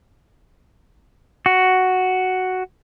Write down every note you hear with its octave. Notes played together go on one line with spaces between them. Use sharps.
F#4